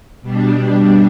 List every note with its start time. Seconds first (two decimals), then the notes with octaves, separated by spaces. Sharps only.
0.21 B2 G3 D4